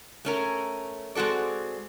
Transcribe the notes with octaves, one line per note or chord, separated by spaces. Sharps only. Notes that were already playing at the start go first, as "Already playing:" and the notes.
A3 C#4 A#4
G#3 C4 F#4 A4 D5